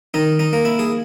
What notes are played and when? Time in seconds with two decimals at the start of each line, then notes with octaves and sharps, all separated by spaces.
0.14 D#3 D#4
0.39 D#4
0.53 A#3
0.65 E4
0.79 G#4